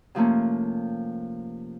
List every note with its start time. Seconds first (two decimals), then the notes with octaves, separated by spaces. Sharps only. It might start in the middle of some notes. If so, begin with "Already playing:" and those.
0.15 C3 F3 A3 A#3 C#4